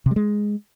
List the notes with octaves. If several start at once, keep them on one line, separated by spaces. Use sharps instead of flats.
C3
G3
G#3